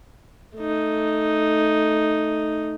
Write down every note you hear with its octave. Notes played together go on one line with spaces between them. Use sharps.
A3 D#4